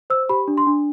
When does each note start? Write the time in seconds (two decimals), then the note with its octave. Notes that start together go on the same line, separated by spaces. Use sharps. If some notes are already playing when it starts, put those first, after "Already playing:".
0.10 C5 E6
0.29 G4 B5
0.48 D4
0.58 C6
0.67 D4